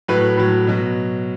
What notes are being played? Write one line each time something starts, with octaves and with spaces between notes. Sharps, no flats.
A2 F#3 B4
A2 F#3
B2 F#3